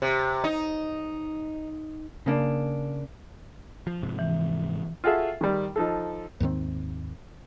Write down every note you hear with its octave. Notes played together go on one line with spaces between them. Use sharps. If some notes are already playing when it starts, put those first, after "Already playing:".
C3
D#4
C#3 A#3 D4
F3
G#2 C3 F3
E3
F4 F#4 G#4 A4 E5
D#3 G3
F3 D#4 A4
D#2 G#2 D#3 C4